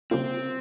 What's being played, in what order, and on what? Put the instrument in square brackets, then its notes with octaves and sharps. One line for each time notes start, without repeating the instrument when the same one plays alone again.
[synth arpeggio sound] C#3 G3 A#3 F4 [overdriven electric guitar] C4